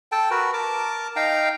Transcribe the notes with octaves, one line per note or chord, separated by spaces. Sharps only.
A4 G5 A5
F#4 A#4 B4
A#4 A5 D6
D#4 F5 G5 A#5